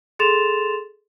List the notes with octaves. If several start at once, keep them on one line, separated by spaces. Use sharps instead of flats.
G#4 A4 C6 A6 E7 F7